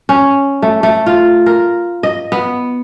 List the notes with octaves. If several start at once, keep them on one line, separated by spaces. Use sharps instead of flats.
C#4
A3
A3
F4
A#4
D#5
B3